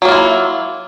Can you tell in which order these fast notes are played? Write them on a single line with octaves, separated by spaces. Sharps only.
F#3 A#3 F4 E4